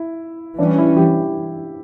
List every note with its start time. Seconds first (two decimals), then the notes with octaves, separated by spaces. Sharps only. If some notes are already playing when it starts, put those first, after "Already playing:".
Already playing: E4
0.59 E3 G3 C#4 D4
0.78 E4
0.97 G4